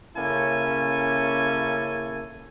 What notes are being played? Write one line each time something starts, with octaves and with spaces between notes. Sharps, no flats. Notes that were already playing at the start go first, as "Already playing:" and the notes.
C#3 A#3 C#4 E4 A4 G#5